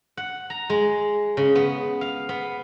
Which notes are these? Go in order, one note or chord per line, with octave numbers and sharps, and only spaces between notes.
F#5
A#5
G#3
C#3
B3
F5
B3